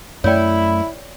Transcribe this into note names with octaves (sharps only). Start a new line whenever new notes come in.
F#2 A3 E4 C#5 D5 G5